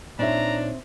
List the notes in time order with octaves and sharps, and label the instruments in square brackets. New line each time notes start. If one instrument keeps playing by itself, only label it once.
[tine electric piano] A#2 D#4 C#5 [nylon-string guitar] C4 E5 [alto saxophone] D4 [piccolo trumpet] A#5